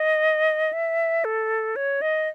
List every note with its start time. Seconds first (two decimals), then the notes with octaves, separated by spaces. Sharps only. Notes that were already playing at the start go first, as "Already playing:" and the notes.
Already playing: D#5
0.73 E5
1.25 A4
1.76 C#5
2.01 D#5